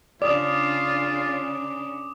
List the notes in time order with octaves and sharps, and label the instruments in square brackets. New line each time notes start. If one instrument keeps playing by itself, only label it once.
[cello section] C#3 C#4 D4 [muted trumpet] F4 [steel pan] D5 [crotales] D6 D#6 E7